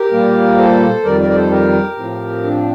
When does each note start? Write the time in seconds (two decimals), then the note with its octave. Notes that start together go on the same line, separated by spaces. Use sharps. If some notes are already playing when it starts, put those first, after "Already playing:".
Already playing: G4 A#4
0.12 A#2 G3 A#3
0.58 A4 C5
1.04 F2 D#3 G3 A#4 D5
1.20 A#4 D5
1.30 D5
1.35 A4 C5
1.51 G4 A#4
1.97 A2 F3 C4
2.44 D4